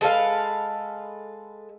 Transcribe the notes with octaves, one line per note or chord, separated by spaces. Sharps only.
G#3 A4 B4 F5